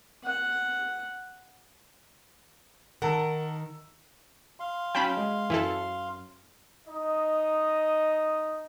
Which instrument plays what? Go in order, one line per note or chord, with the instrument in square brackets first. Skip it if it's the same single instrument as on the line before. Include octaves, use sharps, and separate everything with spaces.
[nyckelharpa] F#5
[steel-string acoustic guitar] D#3 [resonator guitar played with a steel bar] A#4 [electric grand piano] F#5 A5 E6
[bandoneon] F5 C6
[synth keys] F#3 C#4 [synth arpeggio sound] G5 A5 B5
[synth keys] G#3
[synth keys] F#2 [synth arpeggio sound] E3 E4 A4
[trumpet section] D#4 D#5